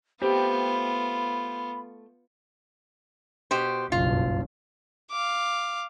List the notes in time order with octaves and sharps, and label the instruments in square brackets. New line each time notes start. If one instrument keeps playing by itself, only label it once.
[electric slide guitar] A3 C5 G5 [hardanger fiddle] B3 F4 [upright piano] G4 [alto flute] B5
[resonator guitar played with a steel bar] B2 G4 C5
[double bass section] F#1 B1 G2 [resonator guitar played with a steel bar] F4
[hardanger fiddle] F5 D6